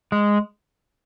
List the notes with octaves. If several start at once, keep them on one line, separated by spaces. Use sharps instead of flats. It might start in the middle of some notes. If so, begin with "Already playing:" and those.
G#3